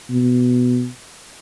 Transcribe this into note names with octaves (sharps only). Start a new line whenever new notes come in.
B2